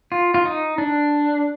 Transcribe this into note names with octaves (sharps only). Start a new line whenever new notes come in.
F4
F4
D#4
D4